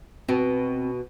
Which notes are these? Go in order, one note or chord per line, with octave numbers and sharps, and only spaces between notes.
B2 C4